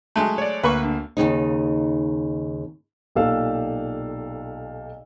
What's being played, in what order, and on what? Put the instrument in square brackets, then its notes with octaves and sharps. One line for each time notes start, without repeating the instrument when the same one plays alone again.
[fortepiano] F#3 G#3 A3
[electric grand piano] C#5 D5
[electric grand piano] D2 A#3 [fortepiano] B4 B5 C#6
[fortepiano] D3
[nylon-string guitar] D#2 G#2 C#3 D#4
[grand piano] B1 A#2 G4 A4 F5 E6